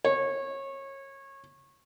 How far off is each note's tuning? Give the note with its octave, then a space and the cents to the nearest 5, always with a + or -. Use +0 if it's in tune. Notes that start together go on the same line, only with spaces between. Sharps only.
C#5 -25